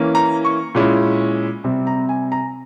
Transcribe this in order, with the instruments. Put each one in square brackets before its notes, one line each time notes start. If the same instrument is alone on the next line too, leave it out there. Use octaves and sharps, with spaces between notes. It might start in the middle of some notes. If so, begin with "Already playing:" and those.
Already playing: [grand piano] E3 A#3 C#4
A#5
C#6
A#2 G#3 C#4 E4
C3 G3 C4
A#5
G#5
A#5